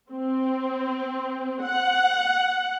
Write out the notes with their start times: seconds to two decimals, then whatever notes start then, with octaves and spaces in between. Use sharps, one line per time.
0.10 C4
1.62 F#5